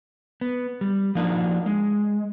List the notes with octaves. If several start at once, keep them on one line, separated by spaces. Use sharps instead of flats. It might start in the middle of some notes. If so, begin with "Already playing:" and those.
B3
G3
F3 A#3 D4 D#4
G#3